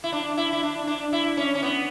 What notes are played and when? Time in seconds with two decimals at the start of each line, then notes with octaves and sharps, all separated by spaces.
0.04 E4
0.12 D4
0.37 E4
0.53 E4
0.63 D4
0.87 D4
1.13 E4
1.37 C#4
1.55 C#4
1.63 B3